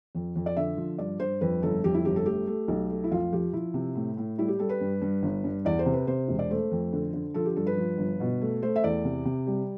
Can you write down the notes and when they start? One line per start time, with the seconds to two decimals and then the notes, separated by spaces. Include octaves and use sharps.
0.15 F2
0.36 F2
0.46 D5
0.56 D3 E5
0.77 F3
0.98 G2 D5
1.20 G2 C5
1.41 F2 B4
1.62 G1 A4
1.84 F2 G4
1.94 E4
2.05 G1 G4
2.16 A4
2.26 A3 G4
2.47 A3
2.68 B1
2.90 A3
3.04 E4
3.11 F2 F4
3.32 F3 G4
3.53 F3 E4
3.74 C3
3.95 A2
4.17 A2
4.38 G3 E4
4.48 G4
4.59 G3 A4
4.69 B4
4.81 G2
5.01 G2
5.23 G1
5.44 G2
5.65 E2 D5
5.79 C5
5.86 C3
5.93 B4
6.07 C3 C5
6.28 E1
6.39 D5
6.50 A3 C5
6.71 F2
6.93 D3
7.14 D3
7.34 F3 A4
7.45 G4
7.56 G2 A4
7.67 B4
7.77 F3
7.98 G1
8.20 B2
8.41 A3
8.62 A3 C5
8.76 E5
8.84 E2 D5
9.05 C3
9.25 C3
9.47 G3